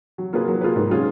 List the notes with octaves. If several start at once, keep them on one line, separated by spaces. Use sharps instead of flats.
F#3
A#3 F4 G#4 B4
F#3
A#3 F4 G#4 B4
G#2
F#3 C#4 F4 G#4